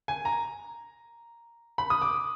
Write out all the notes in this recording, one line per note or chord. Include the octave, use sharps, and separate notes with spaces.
G#5
A#5
B5
D#6
D6